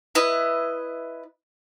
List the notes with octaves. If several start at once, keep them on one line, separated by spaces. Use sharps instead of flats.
E4 B4 D#5